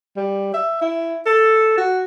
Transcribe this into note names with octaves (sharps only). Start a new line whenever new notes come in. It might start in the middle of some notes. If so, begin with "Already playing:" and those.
G3
E5
E4
A4
F#4